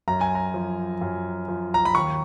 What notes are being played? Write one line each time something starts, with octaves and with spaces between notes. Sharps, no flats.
F#2 A#5
G#5
A#5
F3
F#2
F3
A#5
B5
D#2 C#6